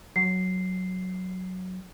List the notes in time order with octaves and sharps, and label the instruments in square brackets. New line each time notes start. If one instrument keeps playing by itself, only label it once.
[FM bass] F#3 [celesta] C7